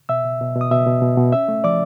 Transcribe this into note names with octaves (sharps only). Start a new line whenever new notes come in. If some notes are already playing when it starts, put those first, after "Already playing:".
B2 E5 E6
B2
B2
B2
D#6
B2 E5 E6
B2
B2
B2
C#4 E5 E6
A3
F3 D5 D6